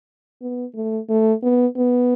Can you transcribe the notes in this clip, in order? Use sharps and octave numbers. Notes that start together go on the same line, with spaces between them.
B3
A3
A3
B3
B3